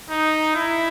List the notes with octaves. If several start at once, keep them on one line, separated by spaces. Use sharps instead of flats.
D#4
E4